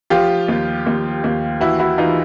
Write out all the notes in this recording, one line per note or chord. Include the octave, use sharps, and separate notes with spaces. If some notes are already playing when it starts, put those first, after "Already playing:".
F3 F4 G4
D#2
D#2
D#2
E3 E4 F#4
E4 F#4
E3 D#4 F4